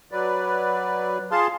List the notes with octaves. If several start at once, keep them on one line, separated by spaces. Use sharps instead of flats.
F#3 B4 D5
F4 G#4 F5 A5 C6